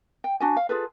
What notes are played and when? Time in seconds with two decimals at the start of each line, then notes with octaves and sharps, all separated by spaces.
0.24 G5
0.40 D4 F#4 G#5
0.56 F5
0.69 F4 G#4 A4 B4